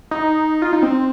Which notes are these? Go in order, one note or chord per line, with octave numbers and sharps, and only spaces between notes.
D#4
F4
D#4
C4